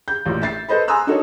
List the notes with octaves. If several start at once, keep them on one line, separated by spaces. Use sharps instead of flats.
G6
A1 A#2
E5 A6 C7
A4 B4 C5 D#5 B5
G#5 A#5 C6 D#6 E6 F#6
D4 D#4 F#4 A4 A#4 C#5